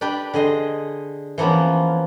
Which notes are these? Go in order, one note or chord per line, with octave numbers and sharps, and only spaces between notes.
D4 G4 B4 D5 G5 B5
D3 G#4 D#5 C6
E3 F3 A#3 B3 C#4